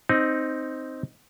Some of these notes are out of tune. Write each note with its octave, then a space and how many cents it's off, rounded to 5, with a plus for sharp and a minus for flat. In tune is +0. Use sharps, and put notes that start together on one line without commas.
C4 +0 D#4 +0